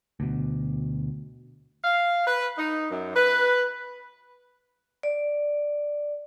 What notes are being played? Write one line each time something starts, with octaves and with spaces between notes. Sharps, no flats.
D2 B2
F5
B4
D#4
F#2
B4
D5